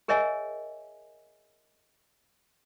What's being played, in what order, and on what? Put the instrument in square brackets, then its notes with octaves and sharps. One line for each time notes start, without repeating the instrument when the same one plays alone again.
[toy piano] G#4 A#4 C#5 D#5 E5 G#5